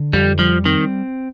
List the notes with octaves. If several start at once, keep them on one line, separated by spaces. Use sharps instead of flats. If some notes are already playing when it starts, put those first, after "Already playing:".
Already playing: D3
F2 G3
F3 G3
D#3 C4